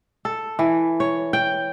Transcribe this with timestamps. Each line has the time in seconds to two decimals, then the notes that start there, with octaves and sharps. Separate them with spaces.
0.25 A4
0.59 E3
1.00 C#5
1.33 G5